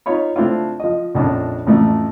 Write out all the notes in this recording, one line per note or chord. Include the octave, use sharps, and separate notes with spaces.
D#4 F4 C#5 B5
A3 C4 D4 E4 F4
F3 D#5
A#1 F2 C#4 D4
A1 F2 A2 E3 A3